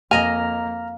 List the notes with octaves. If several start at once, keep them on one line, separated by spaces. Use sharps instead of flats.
F2 A#3 D#5 F5 G#5 A#5 F6